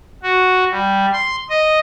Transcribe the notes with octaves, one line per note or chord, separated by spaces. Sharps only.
F#4
G3
C6
D#5